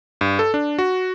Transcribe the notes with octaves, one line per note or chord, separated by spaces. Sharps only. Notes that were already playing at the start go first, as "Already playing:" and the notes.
G2
A4
D4
F#4